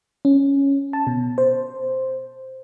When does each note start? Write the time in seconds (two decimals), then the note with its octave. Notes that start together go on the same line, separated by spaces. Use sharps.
0.25 C#4
0.93 A5
1.07 B2
1.38 C5